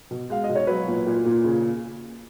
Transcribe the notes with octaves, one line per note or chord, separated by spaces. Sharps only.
B2
G#3 F5
D#5
B2
C#5
F#3 B4
A#2
A#2
A#2
C#3